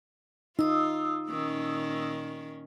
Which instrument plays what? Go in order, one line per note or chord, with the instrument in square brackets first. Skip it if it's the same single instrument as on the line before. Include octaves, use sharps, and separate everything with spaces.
[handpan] D#4 [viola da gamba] F4 [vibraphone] D#6 E6
[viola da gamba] A#2 D#3 C#4